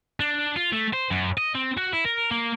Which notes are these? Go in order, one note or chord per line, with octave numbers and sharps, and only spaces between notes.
D4
F4
A3
C5
F#2
D#5
C4
F#4
E4
A#4
A#3